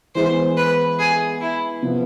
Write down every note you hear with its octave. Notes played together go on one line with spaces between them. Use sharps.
E3 G#3 B3 C5
B4
G#4
E4
C3 F3 B3